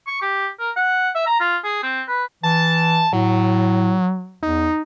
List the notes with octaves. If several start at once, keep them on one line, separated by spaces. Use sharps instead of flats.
C#6
G4
A#4
F#5
E5
A#5
F4
G#4
C4
B4
E3 A5
A2 F#3
E2 D#4